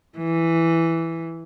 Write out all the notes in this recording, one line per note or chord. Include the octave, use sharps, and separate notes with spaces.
E3